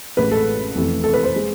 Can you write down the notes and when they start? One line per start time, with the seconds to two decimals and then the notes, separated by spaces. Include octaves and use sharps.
0.17 A1 A2 G#3 B4
0.31 A4
0.75 F1 F2 E3 A3
1.04 A4
1.14 B4
1.23 C5
1.36 G#3